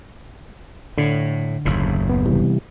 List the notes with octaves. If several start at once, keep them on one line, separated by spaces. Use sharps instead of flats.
A2 D3
F#1 D#2 A2
B3
C3 E3 G3